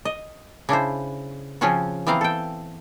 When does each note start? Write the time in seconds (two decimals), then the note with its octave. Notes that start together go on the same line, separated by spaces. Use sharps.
0.05 D#5
0.69 C#3 D4 E4 C5
1.61 C#3 F3 C4 C#4 F4 F#4
2.07 E3 B3 C4 F5 A#5
2.21 A4 G5